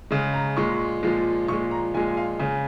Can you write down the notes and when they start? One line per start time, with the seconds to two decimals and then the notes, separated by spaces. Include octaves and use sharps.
0.11 C#3 G#3
0.34 A#5
0.57 A#2 G#3 C#6
1.03 A#2 F3 G#3
1.48 A#2 F3 G#3 C#6
1.71 A#5
1.94 A#2 F3 G#3 G#5
2.08 G#5
2.17 F5
2.39 C#3 G#3 G#5